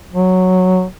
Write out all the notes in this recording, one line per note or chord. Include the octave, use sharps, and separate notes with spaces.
F#3